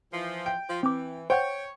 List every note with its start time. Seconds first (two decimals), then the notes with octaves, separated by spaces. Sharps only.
0.13 E3 F3
0.46 G5
0.69 F3
0.83 E3 C4 D6
1.30 C5 C#5 F#5 G5 G6